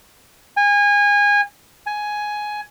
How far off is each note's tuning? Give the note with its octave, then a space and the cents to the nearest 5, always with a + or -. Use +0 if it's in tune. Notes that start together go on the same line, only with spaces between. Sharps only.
G#5 -25
G#5 +10